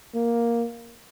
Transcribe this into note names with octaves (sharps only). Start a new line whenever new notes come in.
A#3